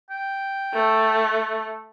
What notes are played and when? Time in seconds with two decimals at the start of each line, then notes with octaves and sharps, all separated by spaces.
0.10 G5
0.73 A3